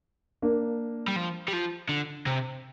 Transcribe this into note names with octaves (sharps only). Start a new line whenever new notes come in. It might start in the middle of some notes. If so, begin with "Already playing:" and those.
A#3 D4
G3
F3
G3
F3
D3
C3